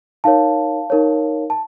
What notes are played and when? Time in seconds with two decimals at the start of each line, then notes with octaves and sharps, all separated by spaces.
0.24 D#4 A#4 C#5 F5 A5
0.90 D#4 A#4 C#5
1.50 A5